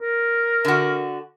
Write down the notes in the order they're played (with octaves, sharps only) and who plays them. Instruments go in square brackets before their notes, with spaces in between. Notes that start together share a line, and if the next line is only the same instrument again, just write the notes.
[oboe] A#4
[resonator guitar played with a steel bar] D3 F#4